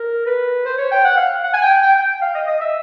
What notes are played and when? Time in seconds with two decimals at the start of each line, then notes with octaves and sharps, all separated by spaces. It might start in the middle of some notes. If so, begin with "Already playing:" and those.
Already playing: A#4
0.26 B4
0.66 C5
0.78 C#5
0.91 G5
1.04 F#5
1.17 F5
1.44 F#5
1.53 G#5
1.63 G5
1.83 G5
1.95 G5
2.22 F5
2.35 D#5
2.48 D#5
2.61 E5